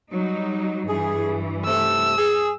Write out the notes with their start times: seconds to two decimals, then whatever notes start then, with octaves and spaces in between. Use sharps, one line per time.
0.11 F#3 G3 D#4
0.89 G2 E3 G#4
1.66 C3 A3 E6
2.17 G#4